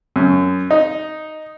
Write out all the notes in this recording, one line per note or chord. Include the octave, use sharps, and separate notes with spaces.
F#2
D#4